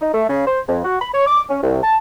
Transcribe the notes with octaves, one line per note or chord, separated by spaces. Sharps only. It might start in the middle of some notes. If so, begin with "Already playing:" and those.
D#4
A3
C#3
C5
F2
F#4
B5
C#5
D6
C#4
C2
A5